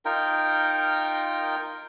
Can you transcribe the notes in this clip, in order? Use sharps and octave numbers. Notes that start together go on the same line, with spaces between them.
D#4 F4 A#4 G5